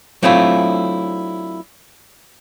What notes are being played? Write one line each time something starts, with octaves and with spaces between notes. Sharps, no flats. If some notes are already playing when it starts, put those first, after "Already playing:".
F#3 A3 C4 D4 E4 F4